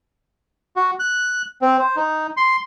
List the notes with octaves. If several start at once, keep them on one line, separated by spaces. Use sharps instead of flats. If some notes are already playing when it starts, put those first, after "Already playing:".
F#4
F#6
C4
C5
D#4
C6